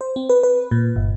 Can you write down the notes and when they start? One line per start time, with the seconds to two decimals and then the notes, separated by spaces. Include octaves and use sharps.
0.01 C5
0.16 C4
0.29 B4
0.43 B4
0.71 A#2
0.96 G1